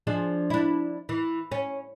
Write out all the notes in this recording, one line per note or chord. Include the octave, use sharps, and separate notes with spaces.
F3 D4 G#4
D4 E4
E3
C#4